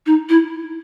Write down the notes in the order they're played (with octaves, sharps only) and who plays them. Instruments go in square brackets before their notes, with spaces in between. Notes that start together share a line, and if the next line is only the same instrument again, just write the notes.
[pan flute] D#4
E4